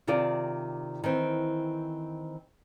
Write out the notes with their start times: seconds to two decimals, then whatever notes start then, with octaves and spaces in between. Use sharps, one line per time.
0.07 C3 D#3 F4 G#4 D5
1.04 D#3 E3 C4